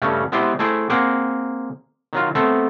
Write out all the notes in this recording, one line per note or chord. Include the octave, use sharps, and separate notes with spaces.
G2 C#3 A3 C#4
G#3 B3 E4 G4 B4 C5
A3 E4 G#4 C5 G5
A#3 C4 G#4 F#5 G5
D#3 F#3 F4
A3 B3 C4 A4